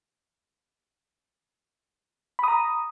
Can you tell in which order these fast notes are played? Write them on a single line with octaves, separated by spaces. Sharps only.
B5 D#6 A#5